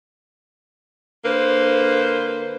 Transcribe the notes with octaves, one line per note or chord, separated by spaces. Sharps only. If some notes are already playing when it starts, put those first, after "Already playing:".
D3 A#3 B4 C5